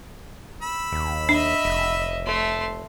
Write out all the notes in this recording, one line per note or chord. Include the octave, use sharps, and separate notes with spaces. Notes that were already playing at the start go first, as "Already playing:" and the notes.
B5 E6
D#2
D4 D#5 E5
F1
A3 C6